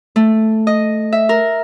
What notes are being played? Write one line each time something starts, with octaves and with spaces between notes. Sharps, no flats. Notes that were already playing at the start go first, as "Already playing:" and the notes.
A3
D#5
E5
A#4